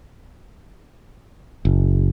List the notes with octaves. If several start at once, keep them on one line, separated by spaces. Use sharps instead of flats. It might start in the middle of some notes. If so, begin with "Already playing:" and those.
F#1